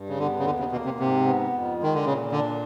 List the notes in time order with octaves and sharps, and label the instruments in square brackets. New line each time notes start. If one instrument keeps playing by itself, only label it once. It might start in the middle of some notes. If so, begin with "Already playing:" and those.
Already playing: [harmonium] G2
[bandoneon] C#3
[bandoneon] D3 [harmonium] B3
[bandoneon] C#3
[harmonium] D#2 [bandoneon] D3
[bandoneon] C#3
[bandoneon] B2 [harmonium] A#3
[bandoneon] C3
[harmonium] G#2 [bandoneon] C3
[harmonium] B3
F2
[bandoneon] D#3 [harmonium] G#3
[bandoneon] D3
[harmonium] A#2 [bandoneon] C#3
[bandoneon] D3 [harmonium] D4